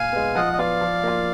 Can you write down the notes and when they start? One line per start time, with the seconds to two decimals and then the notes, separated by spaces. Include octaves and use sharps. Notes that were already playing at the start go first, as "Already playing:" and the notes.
Already playing: A#2 F5 G#5
0.13 G#3 B3
0.35 F3 D#5 F#5
0.53 D#5
0.58 B3 F4 D5 F5
0.81 F3
1.04 A#3 F4